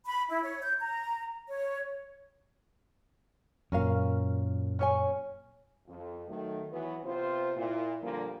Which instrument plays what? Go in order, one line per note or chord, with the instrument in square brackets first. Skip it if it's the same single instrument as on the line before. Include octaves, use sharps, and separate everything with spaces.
[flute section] B5
E4
C#5
G6
A#5
C#5
[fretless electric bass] F#2 A#2 [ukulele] C#4 A#4 F5
[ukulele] C#4 C#5 G#5
[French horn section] F2
D#3 F#3 A3
E3 F#3 B3
C3 B3 F4 C5
A#2 E4
A#2 D3 F3 G3 A#3